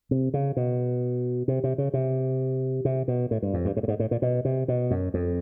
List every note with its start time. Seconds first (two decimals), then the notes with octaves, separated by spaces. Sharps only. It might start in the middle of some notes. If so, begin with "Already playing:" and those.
0.11 C3
0.34 C#3
0.57 B2
1.48 C3
1.64 C3
1.78 C#3
1.94 C3
2.85 C3
3.08 B2
3.31 A2
3.42 G2
3.54 F2
3.65 G2
3.77 G#2
3.83 A2
3.88 G#2
4.00 A2
4.11 A#2
4.22 B2
4.45 C3
4.68 B2
4.91 F#2
5.14 F2